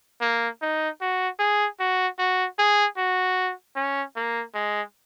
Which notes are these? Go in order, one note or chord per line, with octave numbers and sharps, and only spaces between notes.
A#3
D#4
F#4
G#4
F#4
F#4
G#4
F#4
C#4
A#3
G#3